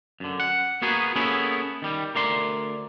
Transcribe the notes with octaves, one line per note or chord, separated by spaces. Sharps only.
F#2 D3
F#5
A#3 B3 F#4 G#4 A#4 B4
A#3 B3 C#4 E4 G#4 A4
D#3 G3
D2 A#4 D5 C6